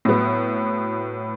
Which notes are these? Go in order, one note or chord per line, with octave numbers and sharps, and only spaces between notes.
A2 F#3 B3